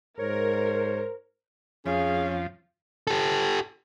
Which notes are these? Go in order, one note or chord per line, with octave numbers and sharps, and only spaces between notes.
G#2 A#4 C5 C#5
F2 F3 C#4 G#4 F5
G4 A4